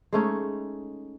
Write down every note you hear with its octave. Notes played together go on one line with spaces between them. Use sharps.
G#3 A3 C#4 D#4